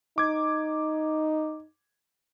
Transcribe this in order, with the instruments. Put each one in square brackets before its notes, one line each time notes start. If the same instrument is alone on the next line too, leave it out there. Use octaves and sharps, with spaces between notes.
[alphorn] D#4 [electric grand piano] D6 G#6